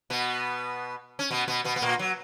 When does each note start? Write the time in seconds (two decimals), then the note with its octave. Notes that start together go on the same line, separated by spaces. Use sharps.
0.10 B2 B3
1.19 C#4
1.31 B2 B3
1.48 B2 B3
1.65 B2 B3
1.76 B3
1.82 A#2 A#3
1.99 F#3